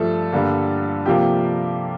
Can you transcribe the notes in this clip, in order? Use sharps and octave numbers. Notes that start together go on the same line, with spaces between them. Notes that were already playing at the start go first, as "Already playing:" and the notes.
Already playing: G2 F3 A3 A4
G2 D3 G3 A#3
C3 F3 A#3 G4